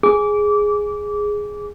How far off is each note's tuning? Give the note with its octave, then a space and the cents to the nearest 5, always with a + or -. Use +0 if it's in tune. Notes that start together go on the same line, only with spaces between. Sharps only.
G#4 +0 D6 -20